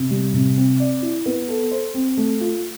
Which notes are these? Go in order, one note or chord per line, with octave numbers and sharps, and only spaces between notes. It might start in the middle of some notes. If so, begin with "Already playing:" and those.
Already playing: C3
G3
C3
C4
D5
E4
B3
A4
C5
C4
A3
F4